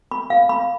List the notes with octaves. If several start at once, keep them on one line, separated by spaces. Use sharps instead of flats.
B5
F5
B5